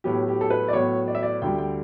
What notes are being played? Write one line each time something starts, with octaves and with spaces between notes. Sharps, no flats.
A2 F#3 B3 G4
G4
A4
B4
D5
A2 F#3 B3 C#5
D5
E5
D5
D2 D3 G3 G5
G5